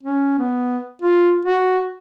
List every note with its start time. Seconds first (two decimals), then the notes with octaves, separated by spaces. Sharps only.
0.03 C#4
0.39 B3
1.02 F4
1.45 F#4